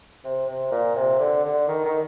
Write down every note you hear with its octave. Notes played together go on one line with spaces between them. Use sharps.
C3
C3
A#2
C3
D3
D3
D#3
D#3